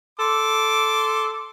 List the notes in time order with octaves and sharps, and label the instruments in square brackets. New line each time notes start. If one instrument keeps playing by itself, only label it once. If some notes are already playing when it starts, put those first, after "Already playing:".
[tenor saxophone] A4 [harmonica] C6 D6